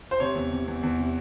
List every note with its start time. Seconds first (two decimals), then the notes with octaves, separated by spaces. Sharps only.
0.11 C5
0.20 C3 C#5
0.36 E2
0.52 C3
0.68 E2
0.83 E2
0.99 C3